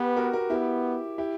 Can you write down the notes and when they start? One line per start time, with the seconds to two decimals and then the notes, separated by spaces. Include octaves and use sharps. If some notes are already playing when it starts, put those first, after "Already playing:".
Already playing: B3 G4 B4
0.16 F#4 A#4
0.33 F#4 A#4
0.50 B3 E4 G4
1.18 E4 G4